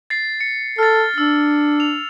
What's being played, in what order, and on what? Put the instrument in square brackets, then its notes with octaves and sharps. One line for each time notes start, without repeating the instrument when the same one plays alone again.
[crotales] A6 C7
C#7
[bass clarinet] A4 [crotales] F6 A6
[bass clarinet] D4 [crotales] E6
[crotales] F7